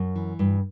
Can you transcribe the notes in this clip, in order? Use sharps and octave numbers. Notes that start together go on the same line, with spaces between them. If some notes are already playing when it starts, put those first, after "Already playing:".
Already playing: F#2
E3
G2